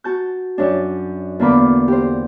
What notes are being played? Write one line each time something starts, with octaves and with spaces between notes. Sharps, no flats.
F#4 A5 G6
F#2 D4
E2 D3 A#3 B5 D6
G4 C5